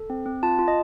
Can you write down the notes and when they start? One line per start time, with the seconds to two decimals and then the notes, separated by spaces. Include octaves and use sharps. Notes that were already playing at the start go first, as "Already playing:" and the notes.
Already playing: A4
0.10 C4
0.26 C4
0.43 F4 A5
0.59 F4
0.68 D#5